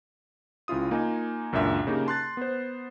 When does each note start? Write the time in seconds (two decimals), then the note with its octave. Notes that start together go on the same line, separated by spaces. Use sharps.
0.68 C#2 C#4 E4 F4 D#6
0.91 A#3 D#4 F4 G#5
1.53 C#2 F#2 A#2 D4 E5
1.87 C#3 A#3 D#4 G4
2.06 A5 C6 F#6 A6
2.37 B3 C5